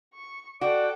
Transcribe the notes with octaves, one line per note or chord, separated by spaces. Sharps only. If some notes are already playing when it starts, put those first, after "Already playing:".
C#6
F#4 A4 D5 G5 D6